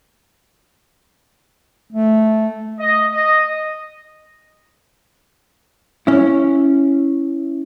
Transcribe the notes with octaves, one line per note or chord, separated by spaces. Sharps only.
A3
D#5
D#5
C#4 E4